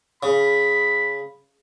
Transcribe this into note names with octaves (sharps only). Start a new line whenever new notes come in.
C#3 B5